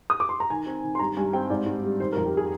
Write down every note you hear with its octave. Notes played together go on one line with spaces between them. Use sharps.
D#6
D6
C6
A#5
D#3 G#5
C4
D#3
C6
G2 A#5
G2 G#5
C4 G5
G#2 D5
G#2
G3
D#3 C5
A#4
F2
G4
G#4